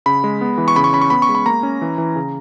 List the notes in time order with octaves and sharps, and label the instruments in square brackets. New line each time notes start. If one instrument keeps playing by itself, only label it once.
[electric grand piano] C#3 B5
G#3
B3
E3
C#6
C#3 B5
C#6
C#4 B5
C#6
B3 B5
C#6
G#3
B5
A#3 A#5
C#4
E3
E3
C#3